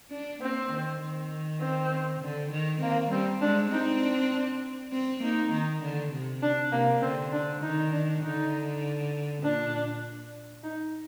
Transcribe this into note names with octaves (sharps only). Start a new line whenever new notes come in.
D4
A#3 C4
D#3
D#3
C4
D3
D#3
A#3 C4
G3 C4
G#3 D4
C4 D#4
D4
C4
A#3 D#4
D#3
D3
C3
D4
C3 A#3
D3 C4
D4
D#3 D#4
D4
D3 D#4
A#2 D4
D#4